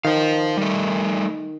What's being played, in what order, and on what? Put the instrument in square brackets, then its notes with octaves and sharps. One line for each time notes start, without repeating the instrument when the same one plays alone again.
[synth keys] D#3 [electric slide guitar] C5 F5
[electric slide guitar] G3 A3